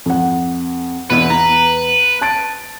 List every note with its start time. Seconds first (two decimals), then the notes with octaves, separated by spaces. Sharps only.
0.06 F2 F#5
1.10 E2 B2 B3 E4 B4
1.30 A#5
2.21 A5 A6 D7